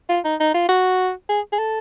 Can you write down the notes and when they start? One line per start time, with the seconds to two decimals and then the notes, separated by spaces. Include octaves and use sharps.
0.09 F4
0.25 D#4
0.40 D#4
0.54 F4
0.69 F#4
1.29 G#4
1.52 G#4
1.59 A4